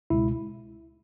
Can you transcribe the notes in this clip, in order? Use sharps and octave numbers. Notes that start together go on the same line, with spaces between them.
C#2 B2 G#3 E4